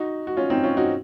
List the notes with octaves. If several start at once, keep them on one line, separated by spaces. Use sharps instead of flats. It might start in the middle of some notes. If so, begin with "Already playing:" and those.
Already playing: D#4 F#4
F#4
C#4 F4
C4 D#4
C#4 F4
D#4 F#4